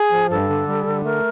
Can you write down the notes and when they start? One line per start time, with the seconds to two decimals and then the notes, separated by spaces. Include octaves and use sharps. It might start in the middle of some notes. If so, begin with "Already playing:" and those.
Already playing: G#4
0.11 F3
0.30 G2 A4
0.49 D3
0.68 G3
0.86 D3
1.04 A3 A#4